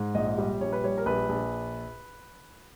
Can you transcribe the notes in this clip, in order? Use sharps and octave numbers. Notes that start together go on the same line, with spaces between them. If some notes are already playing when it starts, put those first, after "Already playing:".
Already playing: G#2
A#1 D#5
G3
A#1 C#5
B4
G3 C#5
A#4
A#1 B4
A#1